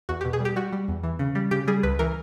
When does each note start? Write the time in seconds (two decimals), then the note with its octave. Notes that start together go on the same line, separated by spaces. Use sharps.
0.09 E2 F#4
0.21 G4
0.25 B2
0.33 G#4
0.40 G3
0.45 G4
0.56 G3 F#4
0.72 G3
0.88 E2
1.03 E3
1.19 C#3
1.35 G3
1.51 C#3 G4
1.67 G3 G#4
1.83 C#2 B4
1.99 E3 A#4